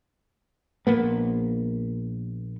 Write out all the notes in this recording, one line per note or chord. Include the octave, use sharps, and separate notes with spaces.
A#1 A#3 B3